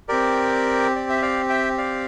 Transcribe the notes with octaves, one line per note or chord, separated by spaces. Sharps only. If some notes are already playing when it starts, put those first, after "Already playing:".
C4 G4 A#4 D5
D5
E5
D5 F5
E5 G5
D5 F5